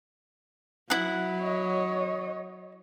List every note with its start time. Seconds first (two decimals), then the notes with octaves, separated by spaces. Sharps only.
0.90 F#3 E4 F#5
1.40 C#5 D#5